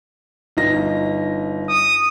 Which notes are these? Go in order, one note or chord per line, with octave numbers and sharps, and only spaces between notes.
G1 D#4 A#6
D#6